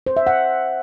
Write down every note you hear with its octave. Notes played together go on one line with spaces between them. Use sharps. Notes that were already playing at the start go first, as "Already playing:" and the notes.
C5
E5
F#5